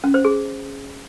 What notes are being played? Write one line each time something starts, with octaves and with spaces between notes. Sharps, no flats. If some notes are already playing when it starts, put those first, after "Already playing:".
C#4
C5
G#4